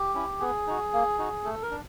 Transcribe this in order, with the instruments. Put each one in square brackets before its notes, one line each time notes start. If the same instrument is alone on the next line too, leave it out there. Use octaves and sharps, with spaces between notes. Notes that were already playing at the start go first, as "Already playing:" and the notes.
Already playing: [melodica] G4
C#4 E4
B3 G#4
D#4 F#4
A#3
D#4 F#4
A3 A4
A#4
D4